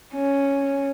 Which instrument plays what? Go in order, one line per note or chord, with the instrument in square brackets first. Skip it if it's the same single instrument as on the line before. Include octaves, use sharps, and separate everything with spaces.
[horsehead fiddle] C#4